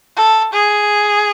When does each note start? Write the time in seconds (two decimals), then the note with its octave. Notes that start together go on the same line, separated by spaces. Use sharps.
0.16 A4
0.53 G#4